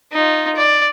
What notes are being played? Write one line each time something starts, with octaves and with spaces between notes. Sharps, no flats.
D#4 F4
D5